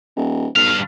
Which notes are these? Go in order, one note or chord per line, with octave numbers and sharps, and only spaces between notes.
D#1
B1 G2 F5